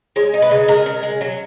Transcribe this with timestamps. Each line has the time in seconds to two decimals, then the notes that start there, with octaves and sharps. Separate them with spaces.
0.16 G#3 C#5
0.34 D#4
0.42 B4
0.51 C#3
0.68 G#3 A#4
0.86 C#3
1.03 G#3
1.21 F#3